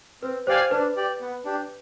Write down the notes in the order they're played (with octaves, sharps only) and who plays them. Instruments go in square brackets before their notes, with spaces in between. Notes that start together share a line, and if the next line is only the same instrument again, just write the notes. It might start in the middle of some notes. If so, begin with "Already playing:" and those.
[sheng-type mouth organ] C4 [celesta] B4
[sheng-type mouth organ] G4 D5 F5 G#5 [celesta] C5
[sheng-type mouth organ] D4 [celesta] B4
[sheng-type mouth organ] G4 D5
B3
D4 G4